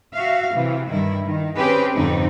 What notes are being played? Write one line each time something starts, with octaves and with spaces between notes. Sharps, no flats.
F#4 E5 F5
C3 E3
G2 D#3 E4
D#3
C4 C#4 G4 G#4 B4
F2 G#2 D3 C4 D#4